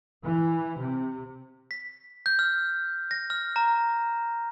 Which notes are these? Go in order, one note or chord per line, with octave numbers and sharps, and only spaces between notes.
E3
C3
B6
G6
F6
A#6
F6
A#5